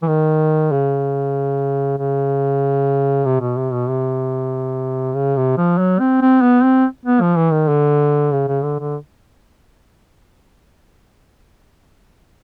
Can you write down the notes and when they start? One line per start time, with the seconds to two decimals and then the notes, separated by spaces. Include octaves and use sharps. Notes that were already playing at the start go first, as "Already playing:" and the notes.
0.03 E3
0.08 D#3
0.72 C#3
1.98 C#3
3.25 C3
3.41 B2
3.57 C3
3.73 B2
3.89 C3
5.15 C#3
5.36 C3
5.57 F3
5.78 F#3
6.00 C4
6.21 C4
6.42 B3
6.63 C4
7.05 B3
7.21 F3
7.37 E3
7.53 D#3
7.69 D3
8.32 C#3
8.48 C#3
8.63 D3
8.80 D3